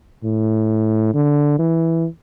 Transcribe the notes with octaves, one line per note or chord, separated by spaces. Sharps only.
A2
D3
E3